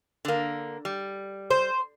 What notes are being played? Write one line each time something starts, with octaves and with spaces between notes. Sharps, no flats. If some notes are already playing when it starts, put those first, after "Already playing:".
D3 A#3
G3
C5